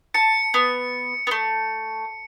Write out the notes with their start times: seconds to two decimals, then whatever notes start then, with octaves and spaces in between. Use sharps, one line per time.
0.14 A5 C#7
0.54 B3
1.27 A3 B3